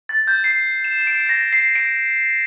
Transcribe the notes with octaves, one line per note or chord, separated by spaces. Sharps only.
A6
G6
C7
E7
D7
A#6
C7
D7